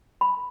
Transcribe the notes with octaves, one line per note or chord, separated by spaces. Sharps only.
B5